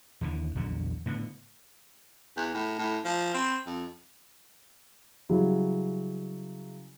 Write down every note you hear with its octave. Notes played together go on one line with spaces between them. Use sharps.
D#2 D3 E3
A#1 E2 D3 F#3
A2 D3 B3
E2
A2
A2
F3
C4
F2
C#3 F#3 G3 E4